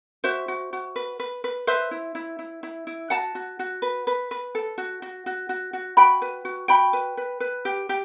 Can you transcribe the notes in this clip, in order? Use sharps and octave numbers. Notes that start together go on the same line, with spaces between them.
F#4 C5 E5
F#4
F#4
B4
B4
B4
B4 C5 E5
E4
E4
E4
E4
E4
F#4 F#5 A5
F#4
F#4
B4
B4
B4
A4
F#4
F#4
F#4
F#4
F#4
F#4 G5 B5
B4
F#4
F#4 G5 B5
B4
B4
B4
G4
G4